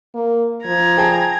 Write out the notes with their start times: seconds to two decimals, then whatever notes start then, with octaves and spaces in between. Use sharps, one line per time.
0.15 A#3
0.66 F3 A#5 G#6
0.97 G#4 G5 A5